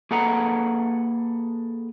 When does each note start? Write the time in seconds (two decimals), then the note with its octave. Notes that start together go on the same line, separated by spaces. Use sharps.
0.11 A#3 G#4 A4 B4 F#5 A#5